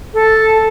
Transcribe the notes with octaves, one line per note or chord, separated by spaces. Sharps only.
A4